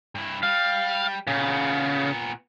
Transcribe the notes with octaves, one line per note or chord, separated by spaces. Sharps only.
G2 E4
G3 F5
A#2 C#3 B3